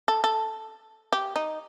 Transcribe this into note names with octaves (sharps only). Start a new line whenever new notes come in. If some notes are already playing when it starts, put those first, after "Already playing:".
A4
A4
G4
D#4